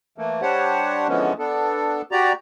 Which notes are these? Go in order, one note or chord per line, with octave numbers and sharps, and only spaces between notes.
E3 A3 A#3
G3 D4 G4 C5 C#5 F#5
D3 E3 F3 G#3 B3 C#4
B3 D4 A4
F#4 G4 D5 A#5